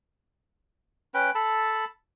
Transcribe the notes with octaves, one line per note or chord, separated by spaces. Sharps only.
C#4 B4 G5
A4 A5 B5